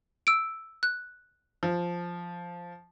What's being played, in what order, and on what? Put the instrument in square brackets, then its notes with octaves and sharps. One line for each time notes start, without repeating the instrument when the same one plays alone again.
[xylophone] E6 D7
F#6
[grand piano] F3